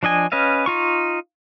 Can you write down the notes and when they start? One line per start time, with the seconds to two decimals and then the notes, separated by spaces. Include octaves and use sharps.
0.03 F3 D4 D#5 G#5
0.32 C#4 B4 D#5 F5
0.66 D#4 F4 C#6